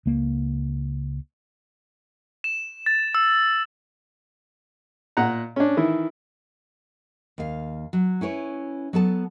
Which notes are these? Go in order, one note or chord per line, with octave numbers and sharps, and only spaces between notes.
C#2 A#3
E7
A6
E6
A#2 F#5 A#5
C#4 D4
D#3 E3 E4
D#2 F5
F#3
C#4 E4 B4 C#5
F#3 B3 A4 A5